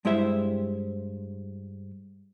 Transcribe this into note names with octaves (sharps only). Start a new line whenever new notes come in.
G2 G#3 E4 G4 C5 E5